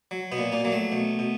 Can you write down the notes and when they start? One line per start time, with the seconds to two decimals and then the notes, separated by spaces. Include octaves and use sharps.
0.11 F#3
0.32 B2 B3
0.38 A#2
0.52 A#2 A#3
0.65 F#3 A#3
0.72 A3
0.92 B2
1.19 B2